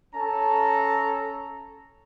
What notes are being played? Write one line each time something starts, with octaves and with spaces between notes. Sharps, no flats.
C#4 A4 A5 A#5